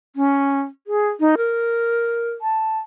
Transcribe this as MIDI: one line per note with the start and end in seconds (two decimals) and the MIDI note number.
0.16 0.61 61
0.87 1.09 68
1.20 1.35 63
1.37 2.31 70
2.41 2.78 81